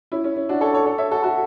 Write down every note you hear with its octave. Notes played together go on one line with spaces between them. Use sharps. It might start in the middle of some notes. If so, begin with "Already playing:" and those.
C#4 E4
C#4
C#4
D4 F#4
A4 C#5
A4 C#5
A4 C#5
C#5 E5
F#4 A4
F#4 A4